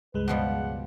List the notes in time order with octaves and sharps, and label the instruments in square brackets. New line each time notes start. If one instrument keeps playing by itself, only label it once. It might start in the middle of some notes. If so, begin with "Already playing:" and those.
[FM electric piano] C#2 G2 G#3 [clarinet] B4
[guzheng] B2 F3 G3 [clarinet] F#5